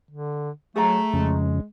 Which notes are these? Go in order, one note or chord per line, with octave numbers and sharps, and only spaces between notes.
D3
F#3 A3 G#4 A#5
F2 C#3 G#3